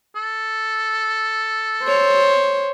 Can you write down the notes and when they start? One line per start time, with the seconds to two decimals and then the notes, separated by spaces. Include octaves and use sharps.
0.16 A4
1.83 C5 C#5